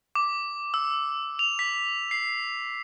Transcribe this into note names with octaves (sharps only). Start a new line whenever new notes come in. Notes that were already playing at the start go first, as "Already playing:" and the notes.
D6
E6
F7
B6
C7